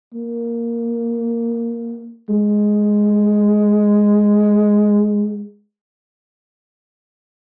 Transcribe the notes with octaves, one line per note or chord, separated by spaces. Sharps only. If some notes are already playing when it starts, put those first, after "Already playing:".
A#3
G#3